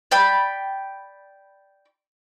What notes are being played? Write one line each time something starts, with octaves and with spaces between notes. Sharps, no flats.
D5 G5 B5